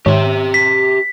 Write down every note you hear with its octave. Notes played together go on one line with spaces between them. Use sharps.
G#2 D#3 G4 C#5 E5
B6